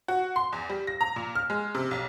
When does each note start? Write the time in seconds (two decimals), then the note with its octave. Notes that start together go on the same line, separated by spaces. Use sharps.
0.08 F#4
0.36 C6
0.53 E2
0.69 G3
0.87 A#6
1.01 A#5
1.16 A#2
1.35 F6
1.50 G#3
1.75 C3
1.91 B1